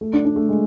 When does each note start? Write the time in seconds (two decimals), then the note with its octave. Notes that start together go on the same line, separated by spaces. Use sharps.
0.01 A3
0.13 D4
0.25 D4
0.36 A3
0.49 G#3